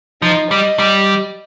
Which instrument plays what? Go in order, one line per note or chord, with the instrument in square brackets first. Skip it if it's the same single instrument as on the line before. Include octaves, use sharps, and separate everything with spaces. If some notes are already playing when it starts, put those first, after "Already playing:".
[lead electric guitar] F3 [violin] D#4
[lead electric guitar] G3 [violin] D#5
[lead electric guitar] G3